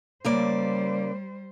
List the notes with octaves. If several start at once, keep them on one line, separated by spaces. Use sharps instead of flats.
C#3 G3 A#3 C5 D5